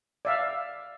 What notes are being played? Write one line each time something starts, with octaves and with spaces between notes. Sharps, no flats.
D5 E5 F5